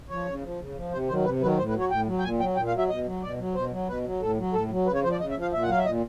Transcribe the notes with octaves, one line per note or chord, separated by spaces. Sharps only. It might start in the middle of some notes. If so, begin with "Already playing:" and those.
F3 C#5
C#3
F3
C#3
F3
C3 C5
D#3 F#3 C5
C3 B4
D#3 F#3 B4
A2 C5
B4
F#3
C#5
A2 G5
F#3
G5
A#2 G#5
F#3 G5
A#2 G5
F5
F#3
E5
B2 D#5
F#3
B2 D5
F#3
B2 C5
F#3
B2 B4
F#3
A2 A4
F#3
A2 A4
F#3
C#3 B4
C#5
F3 C5
D5
C#3 D#5
E5
F3
F5
A#2 E5
F#5
F#3 F5
E5
A#2 D#5